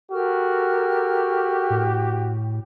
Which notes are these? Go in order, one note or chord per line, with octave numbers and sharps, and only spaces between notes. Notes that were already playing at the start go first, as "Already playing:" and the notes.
F#4 G4 A4 A#4 F6
A2